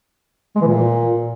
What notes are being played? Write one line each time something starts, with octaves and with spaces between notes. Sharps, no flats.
G#3
E3
A#2